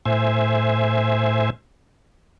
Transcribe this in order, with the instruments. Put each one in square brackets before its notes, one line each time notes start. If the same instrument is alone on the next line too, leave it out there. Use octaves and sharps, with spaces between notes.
[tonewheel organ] A2 C5 E5 G#5